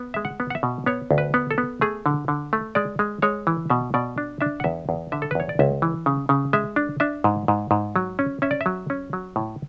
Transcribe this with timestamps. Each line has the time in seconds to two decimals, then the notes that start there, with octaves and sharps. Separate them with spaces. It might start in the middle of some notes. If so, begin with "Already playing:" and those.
Already playing: B3
0.14 G#3 E5
0.25 F#5
0.40 B3
0.50 F#5
0.55 E5
0.63 B2
0.86 B3 C#5
1.11 D2
1.18 B4
1.34 B3
1.51 A4
1.58 B3
1.81 A3 G#4
2.06 D3
2.28 D3
2.53 A3
2.75 G#3 D5
2.99 G#3
3.22 G#3 C#5
3.47 E3
3.70 B2 E5
3.94 B2 D5
4.18 D4
4.41 D4 E5
4.60 F#5
4.64 E2 E5
4.89 E2
5.12 D3 E5
5.22 A4
5.31 B4
5.35 E2 C#5
5.49 D5
5.59 C#2 E5
5.82 E3
6.06 C#3
6.29 C#3
6.53 G#3 E5
6.76 D4
7.00 D4 E5
7.24 G#2
7.48 G#2
7.71 G#2
7.96 F#3
8.19 C#4
8.42 C#4 E5
8.51 D5
8.61 E5
8.66 F#3
8.90 C#4
9.13 F#3
9.36 A2